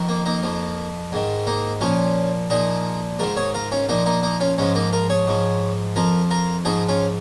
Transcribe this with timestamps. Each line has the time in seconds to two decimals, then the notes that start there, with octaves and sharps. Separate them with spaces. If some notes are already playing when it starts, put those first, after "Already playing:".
Already playing: F2 D#3
0.09 A#3
0.26 A#3 D#4
0.43 F2 F3
1.12 G#2 D#3
1.47 A#3 D#4
1.81 A#2 F3 C#4 F4
2.50 A#2 F3 D#4 G#4
3.19 G#2 D#3 F4 A#4
3.36 G#4 C#5
3.54 F4 A#4
3.72 C#4 F4
3.89 A#2 F3 A#3 D#4
4.06 A#3 D#4
4.23 A#3 D#4
4.40 C#4 F4
4.58 G#2 F3 G#3 C#4
4.75 A#3 D#4
4.93 F4 A#4
5.09 G#4 C#5
5.27 G#2 F3
5.96 F2 F3 F4 A#4
6.31 F4 A#4
6.65 G#2 F3 D#4 G#4
6.88 C#4 F4